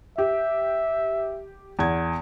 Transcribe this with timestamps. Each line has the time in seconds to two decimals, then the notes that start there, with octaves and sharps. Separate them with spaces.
0.18 G4 E5
1.79 E2 G#6